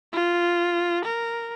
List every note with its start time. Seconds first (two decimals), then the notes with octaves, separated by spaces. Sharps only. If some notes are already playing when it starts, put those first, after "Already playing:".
0.13 F4
1.05 A#4